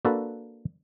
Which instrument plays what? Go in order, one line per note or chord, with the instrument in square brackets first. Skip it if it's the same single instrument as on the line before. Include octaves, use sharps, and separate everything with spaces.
[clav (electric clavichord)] A#3 D4 F#4 A4 B4